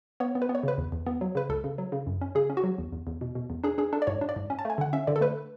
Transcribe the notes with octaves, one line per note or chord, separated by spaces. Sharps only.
B3 C#5
B3
B4
B3
C#5
C#3 B4
E2
E2
B3
F#3
C#3 B4
C#2 A4
C#3
F#3
C#3
F#2
C#4
C#3 G#4
C#4
F#4
F#3
E2
E2
E2
B2
B2
E2
D4 G#4
D4 G#4
D4 A4
D5
G#2 C#5
D4
D5
G#2
C#4
A5
A3 G#5
D3 F#5
C#4 E5
D3 D5
A4
A3 B4